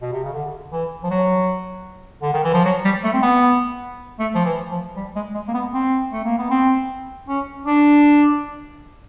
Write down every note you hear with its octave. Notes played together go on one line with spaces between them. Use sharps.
B2
C3
C#3
D3
E3
F3
F#3
D3
D#3
E3
F3
F#3
G3
A3
C4
B3
A3
F3
E3
F3
G3
G#3
G#3
A#3
B3
C4
A3
A#3
B3
C4
C#4
D4